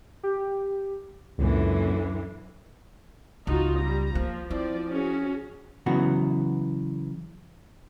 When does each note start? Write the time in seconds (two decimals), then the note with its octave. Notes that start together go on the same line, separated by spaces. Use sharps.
0.23 G4
1.38 C#2 F#2 A#2 D3 E3
3.47 C#2 D#4 F4 F#4
3.78 G3 A#5
4.15 F3 A#3
4.51 F3 C4 E4 D5
4.90 C#4 F#4 G#4
5.86 C#3 E3 F#3 B3 F#4